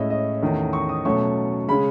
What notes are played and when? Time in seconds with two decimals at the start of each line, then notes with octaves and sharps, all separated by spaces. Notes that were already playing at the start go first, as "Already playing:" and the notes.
Already playing: A2 G#3 C#4 D#5 E5
0.10 D#5
0.43 E2 D#3 A3 C#4
0.73 C#6
0.89 D#6
1.05 B2 F#3 A3 C#4 C#6
1.68 C#3 G#3 C#4 B5